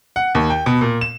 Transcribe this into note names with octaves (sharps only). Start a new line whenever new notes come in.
F#5
D#2
G5
B2
A#2
E7